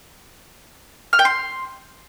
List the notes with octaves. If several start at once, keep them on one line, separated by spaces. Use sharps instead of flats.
F6
G5
C6